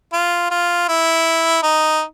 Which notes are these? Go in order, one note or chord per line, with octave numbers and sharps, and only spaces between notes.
F4
F4
E4
D#4